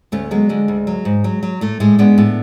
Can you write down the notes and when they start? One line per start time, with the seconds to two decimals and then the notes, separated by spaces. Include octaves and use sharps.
0.12 D2 A3 C#4
0.31 F#3 G#3 B3
0.49 D3 G#3
0.68 D2
0.87 F#3
1.05 G#2
1.24 F#3
1.43 F#3
1.61 A2 A3
1.80 A2 G#3
1.99 G#3 B3 D4
2.18 A2